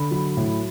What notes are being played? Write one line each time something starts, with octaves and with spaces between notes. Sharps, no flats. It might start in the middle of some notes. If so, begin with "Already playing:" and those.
Already playing: D3 B5
F#3
A2